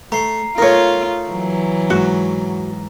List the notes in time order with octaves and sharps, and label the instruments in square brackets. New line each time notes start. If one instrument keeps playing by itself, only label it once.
[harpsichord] A3 [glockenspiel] A#5 C7
[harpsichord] A3 D#4 [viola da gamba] F4 [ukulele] A#4 C#5
[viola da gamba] E3 F#3
[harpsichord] G#2 [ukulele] F#4